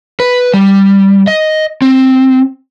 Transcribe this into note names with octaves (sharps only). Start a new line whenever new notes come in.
B4
G3
D#5
C4